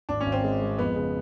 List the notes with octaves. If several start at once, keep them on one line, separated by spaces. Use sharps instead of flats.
G#1 D4
C#4
G#1
C4
G#3
G#3
F2 B3
C#3